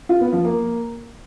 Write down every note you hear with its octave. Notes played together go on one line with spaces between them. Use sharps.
F4
B3
F3
A#3